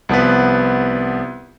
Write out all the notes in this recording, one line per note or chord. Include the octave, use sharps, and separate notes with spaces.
C2 F3 B3 B4